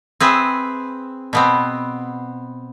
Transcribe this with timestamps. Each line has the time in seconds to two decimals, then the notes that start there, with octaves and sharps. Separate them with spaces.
0.20 C4 G#4 B4 E5
1.33 B2 B3 C4